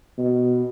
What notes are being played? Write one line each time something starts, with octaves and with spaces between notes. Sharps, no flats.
B2